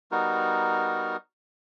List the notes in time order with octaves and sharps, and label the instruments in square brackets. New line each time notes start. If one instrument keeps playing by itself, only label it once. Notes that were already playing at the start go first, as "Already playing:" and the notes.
[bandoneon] G3 B3 D#4 F#4 A#4